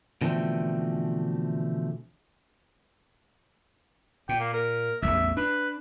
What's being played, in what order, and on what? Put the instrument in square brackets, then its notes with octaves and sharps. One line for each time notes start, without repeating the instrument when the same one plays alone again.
[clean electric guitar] B2 D3 E3 F3 A3 C4
[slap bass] A#2 [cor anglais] G5
[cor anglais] A#3
A#4
[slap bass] A1 E2 G2 [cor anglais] E5
[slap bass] D4 [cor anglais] B4